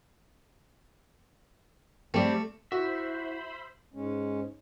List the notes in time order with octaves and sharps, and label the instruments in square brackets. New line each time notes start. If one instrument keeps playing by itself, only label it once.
[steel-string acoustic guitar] G3 C4 [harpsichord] A3
[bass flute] E4 [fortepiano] F#4 [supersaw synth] C5 B5 [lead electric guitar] E5
[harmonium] G#2 G#3 C#4